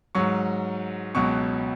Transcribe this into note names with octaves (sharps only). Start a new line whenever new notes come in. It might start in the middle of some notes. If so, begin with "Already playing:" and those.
G#2 F#3 C#6
C#2 B2 F#3 C#6